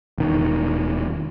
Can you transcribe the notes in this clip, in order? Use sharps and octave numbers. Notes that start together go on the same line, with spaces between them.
E1 D#3